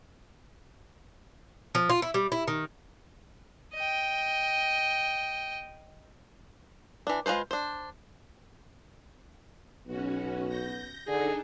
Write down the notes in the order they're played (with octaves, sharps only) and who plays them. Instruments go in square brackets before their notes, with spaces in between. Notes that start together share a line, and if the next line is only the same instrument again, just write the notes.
[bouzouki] F3
F4
E4
G3
E4
D#3
[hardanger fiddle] D#5 G5
[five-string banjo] E3 D4
G#3 F4 A4 B4 C5
D4 C5
[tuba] B1 [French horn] B3 [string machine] C#4 F#4
[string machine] G6 A#6
[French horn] D3 [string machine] D4 D#4 A4 [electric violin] G#4